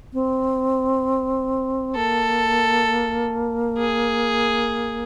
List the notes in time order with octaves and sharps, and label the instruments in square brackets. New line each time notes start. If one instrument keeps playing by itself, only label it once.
[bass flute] C4
[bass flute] A#3 [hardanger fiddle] A4
[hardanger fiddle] G#4